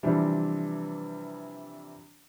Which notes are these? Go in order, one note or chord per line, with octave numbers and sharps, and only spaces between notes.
C3 E3 F3 G3 C4 D4